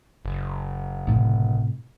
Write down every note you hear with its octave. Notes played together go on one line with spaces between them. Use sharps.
F#1
A2 C3